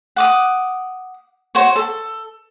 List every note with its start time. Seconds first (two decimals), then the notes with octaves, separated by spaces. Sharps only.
0.16 F#5 D6 D#6
1.55 F#4 C5 C#5
1.76 A4